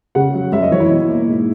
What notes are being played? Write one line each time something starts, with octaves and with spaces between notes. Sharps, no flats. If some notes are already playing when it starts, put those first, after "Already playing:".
C#3 F#5
F#3
F#2 E5
D#5
E3 C#5
E4
B2
A#3
G#2